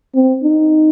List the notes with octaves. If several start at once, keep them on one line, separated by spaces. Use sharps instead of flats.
C4
D#4